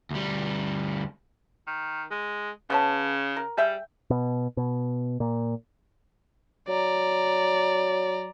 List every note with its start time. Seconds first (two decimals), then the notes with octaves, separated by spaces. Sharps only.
0.10 D2 G3
1.67 D#3
2.11 G#3
2.70 C#3 B3 C#4 A5
3.37 A#4
3.57 G3 G#4 E5 G5
4.10 B2
4.57 B2
5.20 A#2
6.68 F#3 D5 A#5